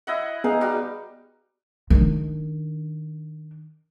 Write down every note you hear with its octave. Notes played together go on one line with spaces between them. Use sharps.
E4 D#5 F#5
B3 D#4 G#4 F5
G3 F#4
D#3 D4